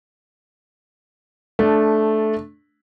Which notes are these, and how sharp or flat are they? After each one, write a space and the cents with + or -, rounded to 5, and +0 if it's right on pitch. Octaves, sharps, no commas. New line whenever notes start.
A3 -10 D4 +0